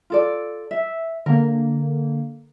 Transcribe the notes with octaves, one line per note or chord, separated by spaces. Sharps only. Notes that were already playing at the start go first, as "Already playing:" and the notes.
F4 A4 D5
E5
D3 A#3 A#4